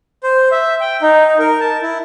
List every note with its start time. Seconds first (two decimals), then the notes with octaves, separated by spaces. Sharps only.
0.23 C5
0.52 E5
0.81 G5
1.02 D#4
1.39 A#4
1.60 A5
1.82 E4